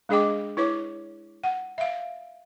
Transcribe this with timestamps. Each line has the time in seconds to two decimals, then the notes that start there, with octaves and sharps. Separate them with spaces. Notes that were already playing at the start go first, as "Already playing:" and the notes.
0.09 G#3 D4 G#4 D#5 G5 D6
0.57 E4 B4 C#5 D6
1.44 F#5
1.78 E5 F5